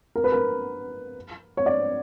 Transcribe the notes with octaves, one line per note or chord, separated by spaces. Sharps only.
A#4
B4
A#4
C#5
D5